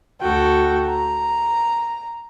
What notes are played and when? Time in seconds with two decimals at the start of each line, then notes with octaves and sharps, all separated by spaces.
0.22 D2 F#4 A4 G5
0.88 A#5